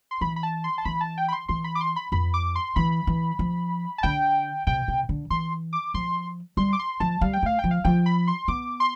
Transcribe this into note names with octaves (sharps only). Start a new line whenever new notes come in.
C6
E3 B5
B5
A5
C6
A5
E3 B5
A5
G5
B5
C6
E3 C6
B5
D6
C6
B5
F2 B5
D6
C6
E3 B5
E3
F3
A5
D3 G5
C3 G5
C3
D3
E3 C6
D6
F3 C6
G3 C6
D6
C6
F3 A5
G3 F5
G5
A3 F5
G5
F3
F5
F3 G5
B5
C6
B3 D6
C6